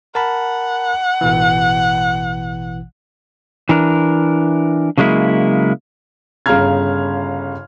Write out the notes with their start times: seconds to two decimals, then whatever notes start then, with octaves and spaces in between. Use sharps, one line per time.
0.15 A#4 F#5 A5 B5
1.21 A1 B2 E3
3.69 E3 D4 A#4
4.97 C#3 F#3 G#3 A#3 E4
6.46 G1 C#3 F5 A#5 F6 G#6